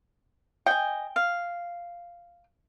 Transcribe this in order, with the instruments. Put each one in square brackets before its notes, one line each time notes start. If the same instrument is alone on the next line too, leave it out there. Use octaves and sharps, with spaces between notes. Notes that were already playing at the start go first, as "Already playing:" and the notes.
[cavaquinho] D#5 G#5 [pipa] G5
[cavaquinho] F5